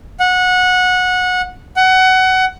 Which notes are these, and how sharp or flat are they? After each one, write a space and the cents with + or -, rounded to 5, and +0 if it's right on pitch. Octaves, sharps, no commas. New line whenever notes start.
F#5 -20
F#5 +20